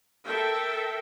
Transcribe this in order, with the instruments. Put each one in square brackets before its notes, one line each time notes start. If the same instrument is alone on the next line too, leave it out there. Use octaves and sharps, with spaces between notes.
[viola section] A4 A#4 E5 G5